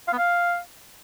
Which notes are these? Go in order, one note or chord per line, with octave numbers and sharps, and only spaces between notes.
F5
B3
F5